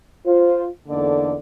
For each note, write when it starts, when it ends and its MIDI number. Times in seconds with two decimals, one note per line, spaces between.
0.25 0.64 65
0.25 0.64 72
0.88 1.35 40
0.88 1.35 50
0.88 1.35 58
0.88 1.35 63
0.88 1.35 69
0.88 1.35 74